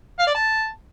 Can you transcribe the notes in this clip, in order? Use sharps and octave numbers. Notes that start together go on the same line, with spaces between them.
F5
D5
A5